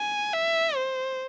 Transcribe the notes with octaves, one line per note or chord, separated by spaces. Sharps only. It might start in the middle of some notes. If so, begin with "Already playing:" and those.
Already playing: G#5
E5
C5